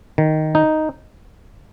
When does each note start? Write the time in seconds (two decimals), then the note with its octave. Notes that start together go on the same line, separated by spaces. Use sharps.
0.18 D#3
0.55 D#4